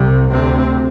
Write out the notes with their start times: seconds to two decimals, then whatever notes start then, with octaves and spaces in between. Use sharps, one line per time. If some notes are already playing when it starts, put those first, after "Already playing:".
Already playing: C2 C3
0.30 D2 C3 C4